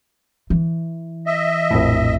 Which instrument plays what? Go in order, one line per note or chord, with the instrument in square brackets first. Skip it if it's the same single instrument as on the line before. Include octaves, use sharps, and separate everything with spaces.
[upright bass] E3
[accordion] D#5 E5
[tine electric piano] A#1 F2 A2